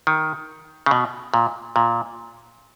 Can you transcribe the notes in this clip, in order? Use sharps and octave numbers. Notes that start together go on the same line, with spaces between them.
D#3
C#3
B2
A#2
A#2